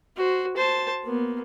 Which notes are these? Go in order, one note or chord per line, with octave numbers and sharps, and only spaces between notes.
F#4 C5
C5 A5
A#3 B3